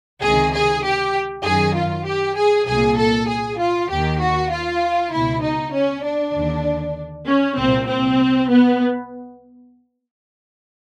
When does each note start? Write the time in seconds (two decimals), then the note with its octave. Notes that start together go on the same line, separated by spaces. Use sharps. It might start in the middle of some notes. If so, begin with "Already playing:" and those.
0.22 C#2 C3 D#3 G#4
0.53 G#4
0.84 G4
1.44 F#2 D#3 G#4
1.75 F4
2.06 G4
2.37 G#4
2.67 C2 A#2 G#4
2.98 A4
3.29 G#4
3.59 F4
3.90 D#2 D#3 G4
4.21 F#4
4.51 F4
5.12 C#2 B2 E4
5.42 D#4
5.73 C#4
6.05 D4
6.35 D#2 D3
7.26 C#4
7.57 C2 A#2 C4
7.88 C4
8.50 B3